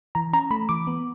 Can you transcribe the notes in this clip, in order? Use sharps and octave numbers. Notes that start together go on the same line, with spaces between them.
E3 A#5
C#4 A#5
A3 B5
E3 D6
B3